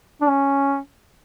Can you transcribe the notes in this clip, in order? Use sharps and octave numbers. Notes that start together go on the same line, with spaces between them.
D4
C#4